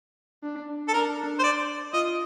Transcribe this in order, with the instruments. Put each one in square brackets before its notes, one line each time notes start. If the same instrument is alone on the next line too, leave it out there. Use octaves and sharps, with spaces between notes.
[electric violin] D4
[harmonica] A4
[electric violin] D4 [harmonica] A#4
[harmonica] C5
D5
[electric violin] F4 [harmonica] D#5